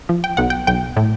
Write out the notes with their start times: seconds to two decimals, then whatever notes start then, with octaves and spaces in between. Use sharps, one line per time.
0.09 F3
0.24 G5
0.37 B1 F#5
0.50 G5
0.67 B1 G5
0.97 A2